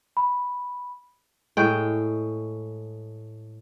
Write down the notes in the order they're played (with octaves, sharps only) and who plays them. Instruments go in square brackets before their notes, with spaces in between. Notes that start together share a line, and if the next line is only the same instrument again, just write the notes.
[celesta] B5
[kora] A2 G#3 G5